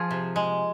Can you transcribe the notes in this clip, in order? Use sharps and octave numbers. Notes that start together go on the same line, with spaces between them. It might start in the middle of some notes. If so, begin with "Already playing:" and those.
Already playing: F3 F4 G#4
C3
G#3